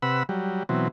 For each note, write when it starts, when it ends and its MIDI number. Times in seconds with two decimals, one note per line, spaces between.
0.02 0.23 48
0.02 0.23 71
0.02 0.23 78
0.02 0.23 83
0.02 0.23 88
0.29 0.63 54
0.29 0.63 55
0.69 0.88 47
0.69 0.88 52
0.69 0.88 54
0.69 0.88 60